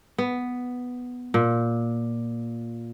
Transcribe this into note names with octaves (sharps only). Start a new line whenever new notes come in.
B3
A#2